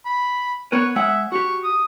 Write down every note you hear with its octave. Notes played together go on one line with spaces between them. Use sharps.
B5
B3 A#4 B4 C#5
G#3 C#5 E5 F#5
F#4 G4 C#6
D#6